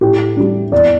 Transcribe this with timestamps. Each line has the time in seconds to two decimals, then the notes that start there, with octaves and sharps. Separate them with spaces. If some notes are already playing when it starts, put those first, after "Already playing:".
0.01 A2 G4
0.37 G3 D4
0.72 E2 D5